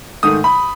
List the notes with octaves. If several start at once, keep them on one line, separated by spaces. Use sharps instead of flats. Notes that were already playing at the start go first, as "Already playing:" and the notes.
G#2 D#3 A3 D#6
B5